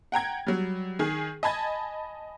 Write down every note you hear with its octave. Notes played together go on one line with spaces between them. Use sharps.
F#5 G5 A#5 G#6
F#3 G3
D#3 G#4
D#5 G#5 A5 B5 G#6 A6